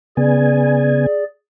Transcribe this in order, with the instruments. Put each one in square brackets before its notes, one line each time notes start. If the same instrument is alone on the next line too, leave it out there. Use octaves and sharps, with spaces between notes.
[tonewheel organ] C#3 B3 G#5 [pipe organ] G#4 D5